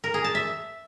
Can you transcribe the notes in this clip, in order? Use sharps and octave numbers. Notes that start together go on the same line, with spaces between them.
A#4
G#4
A5
E5